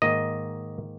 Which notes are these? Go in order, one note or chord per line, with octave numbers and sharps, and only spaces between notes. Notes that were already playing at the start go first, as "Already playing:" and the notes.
G#2 D#3 A#3 D#5